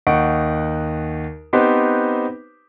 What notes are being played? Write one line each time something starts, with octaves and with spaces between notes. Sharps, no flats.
D#2 D#4 F#5 C#6 D7
B3 C4 D#4 G4 B4 C5